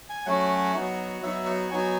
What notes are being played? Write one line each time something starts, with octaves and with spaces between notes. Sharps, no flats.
G#5
F#3 A3 C#4 F#4 F#5
F#3 B3 D#4 F#4
F#3 B3 D#4 F#4 E5
F#5
F#3 B3 D#4 F#4 G#5